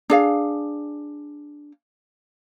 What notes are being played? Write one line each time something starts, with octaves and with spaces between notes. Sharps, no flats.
D4 G#4 F5